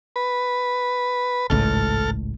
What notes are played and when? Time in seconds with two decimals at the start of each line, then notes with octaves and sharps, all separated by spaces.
0.16 B4
1.50 G#1 C#2 A2 A4 F6